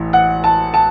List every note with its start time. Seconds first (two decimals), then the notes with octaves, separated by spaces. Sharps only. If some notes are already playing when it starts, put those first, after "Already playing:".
Already playing: A1 E3
0.13 F#5
0.44 A5
0.74 A5